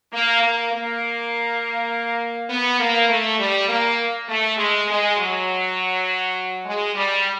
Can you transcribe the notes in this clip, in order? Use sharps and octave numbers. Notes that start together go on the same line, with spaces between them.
A#3
A#3
A#3
B3
A#3
A3
G3
A#3
A3
G#3
G#3
F#3
G#3
G3